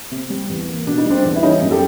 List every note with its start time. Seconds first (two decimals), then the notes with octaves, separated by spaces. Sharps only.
0.11 C3
0.30 G3
0.49 E2
0.68 A#3
0.86 B2 D4
0.98 D#4
1.06 G3 C4 D4
1.25 E2
1.36 E4
1.43 G3 C#4 D#4
1.62 F#2
1.71 G4 A4